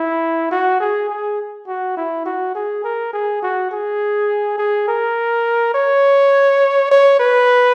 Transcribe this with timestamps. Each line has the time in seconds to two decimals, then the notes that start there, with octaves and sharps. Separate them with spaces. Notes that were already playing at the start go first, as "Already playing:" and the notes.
Already playing: E4
0.51 F#4
0.80 G#4
1.09 G#4
1.68 F#4
1.97 E4
2.26 F#4
2.55 G#4
2.84 A#4
3.13 G#4
3.42 F#4
3.71 G#4
4.58 G#4
4.88 A#4
5.74 C#5
6.91 C#5
7.20 B4